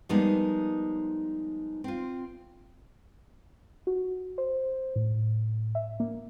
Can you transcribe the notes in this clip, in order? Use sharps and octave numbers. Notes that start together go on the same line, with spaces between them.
F3 G3 G#3 A#3 B3 D#4
C4 F4
F#4
C5
A2
E5
A#3